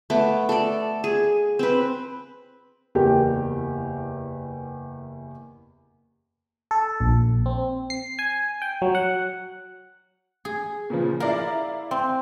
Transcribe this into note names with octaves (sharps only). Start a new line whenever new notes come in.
A3 B3 D6
A4 D5
G#4
C4 B4
F#1 E2 G4 A#4 G5
A4
A#1
C4
C7
G#5
G5
F#3
F#5
G#4
A#2 C#3 F3
E4 A#4 D5 F5
C4